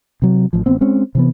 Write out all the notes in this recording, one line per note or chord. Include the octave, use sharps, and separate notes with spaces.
C3 F#3
A1 F3
A1 B3 C4
G#3 C4 C#4
C3 E3 B3